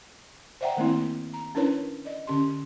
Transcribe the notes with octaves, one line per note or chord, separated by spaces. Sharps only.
C5 D5 E5 F#5 G5 A#5
D#3 A3 A#3 C4 E4
A#5
C#4 D4 E4 A#4 B4 C#5
D5 D#5
D3 C#4 G4 C6